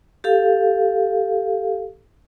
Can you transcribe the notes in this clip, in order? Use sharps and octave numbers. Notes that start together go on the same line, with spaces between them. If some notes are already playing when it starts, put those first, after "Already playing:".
G4 A4 F5